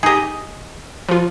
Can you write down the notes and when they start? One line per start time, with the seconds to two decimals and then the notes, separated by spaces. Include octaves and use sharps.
0.03 D#4 G4 G#4 D#5
1.09 F3 F4